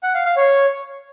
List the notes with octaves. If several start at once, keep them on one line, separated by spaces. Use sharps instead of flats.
F#5
F5
F5
C#5